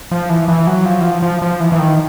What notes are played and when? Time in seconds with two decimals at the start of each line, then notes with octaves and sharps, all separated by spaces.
0.11 F3
0.30 E3
0.48 E3
0.67 F#3
0.86 F3
1.01 E3
1.04 F3
1.22 F3
1.42 F3
1.60 E3
1.72 E3
1.79 D#3